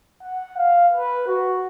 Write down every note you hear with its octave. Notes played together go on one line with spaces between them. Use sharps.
F#5
F5
B4
F#4